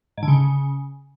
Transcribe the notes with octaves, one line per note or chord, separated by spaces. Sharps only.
G#2
D3
C#3